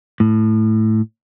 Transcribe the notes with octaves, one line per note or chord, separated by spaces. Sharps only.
A2